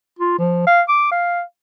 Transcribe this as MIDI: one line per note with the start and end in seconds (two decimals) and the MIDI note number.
0.19 0.37 65
0.38 0.64 53
0.67 0.82 77
0.88 1.10 86
1.11 1.42 77